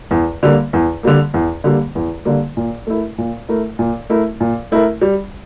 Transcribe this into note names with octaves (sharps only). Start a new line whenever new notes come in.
E2
D3 G3 A#3
E2
D3 G3 A#3
E2
D3 G3 A#3
E2
D3 G3 A#3
A#2
A3 E4 A#4
A#2
A3 E4 A#4
A#2
A3 E4 A#4
A#2
A3 E4 A#4
G3